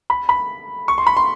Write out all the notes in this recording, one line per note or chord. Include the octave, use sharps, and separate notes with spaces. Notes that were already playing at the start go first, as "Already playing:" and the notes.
B5
B5
C#6
C6
B5
C6